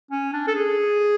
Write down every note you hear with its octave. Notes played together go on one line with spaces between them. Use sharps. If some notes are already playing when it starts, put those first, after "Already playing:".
C#4
D4
A4
G#4